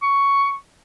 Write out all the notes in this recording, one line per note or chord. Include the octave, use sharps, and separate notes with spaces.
C#6